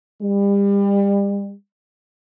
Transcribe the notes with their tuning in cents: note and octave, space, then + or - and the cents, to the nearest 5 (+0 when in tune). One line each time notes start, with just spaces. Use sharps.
G3 +35